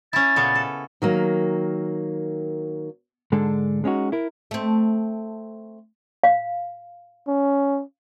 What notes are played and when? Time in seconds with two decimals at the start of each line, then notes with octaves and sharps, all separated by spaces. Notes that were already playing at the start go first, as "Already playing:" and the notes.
0.13 C#4 E4 A6
0.36 A#2 C#3 B3
0.55 A4
1.02 D#3 F#3 A#3
3.32 G#2 D3 G#3 D4 A4
3.84 G#3 C#4 D#4 F#4
4.12 E4 A#4
4.51 A3 C4
6.24 F5
7.28 C#4